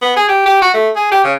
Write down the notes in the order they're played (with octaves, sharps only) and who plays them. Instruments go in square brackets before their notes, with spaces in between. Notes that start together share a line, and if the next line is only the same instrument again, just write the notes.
[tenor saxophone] B3
G#4
G4
G4
F#4
A3
G#4
G4
C#3